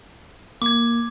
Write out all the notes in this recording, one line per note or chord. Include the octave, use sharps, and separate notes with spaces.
A#3 D6 G#6